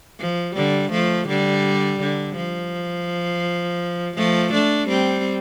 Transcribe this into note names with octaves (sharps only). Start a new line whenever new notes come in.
F3
D3 G3
F3 A3
D3 G3
D3
F3
F3 A3
A3 D4
G3 C4